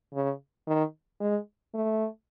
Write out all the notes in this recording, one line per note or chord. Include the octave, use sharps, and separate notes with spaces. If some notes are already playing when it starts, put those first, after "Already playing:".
C#3
D#3
G#3
A3